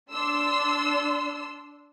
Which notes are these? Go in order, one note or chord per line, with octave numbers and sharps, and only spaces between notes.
D4 C6 E6